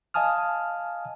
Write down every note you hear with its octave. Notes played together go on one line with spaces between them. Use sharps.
D#5 F5 G#5 A5 D#6 F6